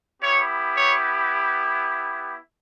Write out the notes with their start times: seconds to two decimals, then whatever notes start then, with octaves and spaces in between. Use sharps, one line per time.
0.21 B3 E4 G4 C#5
0.74 C#5